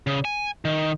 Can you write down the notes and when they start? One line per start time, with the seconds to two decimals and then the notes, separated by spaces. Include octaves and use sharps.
0.07 C#3
0.25 G#5
0.65 D#3